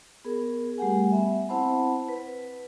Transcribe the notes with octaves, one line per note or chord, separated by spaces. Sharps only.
B3 G#4 A#4
G3 A3 G4 F#5 G#5
B3 E5
C4 E4 C5 F#5 A5 B5
B4